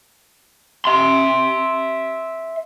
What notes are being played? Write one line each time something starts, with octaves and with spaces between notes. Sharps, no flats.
E5 C6